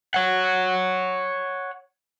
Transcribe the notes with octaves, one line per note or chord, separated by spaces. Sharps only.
C#5 F#5